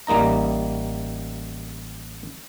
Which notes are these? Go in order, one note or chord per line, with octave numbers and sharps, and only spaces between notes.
A1 G3 A#3 D#4 A#5